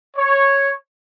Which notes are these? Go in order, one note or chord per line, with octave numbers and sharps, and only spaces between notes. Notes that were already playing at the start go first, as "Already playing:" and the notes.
C#5